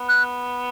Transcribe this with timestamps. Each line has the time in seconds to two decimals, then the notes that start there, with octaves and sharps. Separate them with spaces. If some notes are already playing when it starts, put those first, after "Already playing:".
Already playing: B3
0.09 F#6